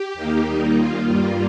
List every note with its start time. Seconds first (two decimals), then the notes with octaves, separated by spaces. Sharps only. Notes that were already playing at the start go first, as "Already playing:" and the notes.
Already playing: G4
0.14 D#2 D#3 A#3
0.45 D#2 D#3 G3 A#3 D#4
0.76 D#2 D#3 A#3 F4
1.07 G2 G3 A#3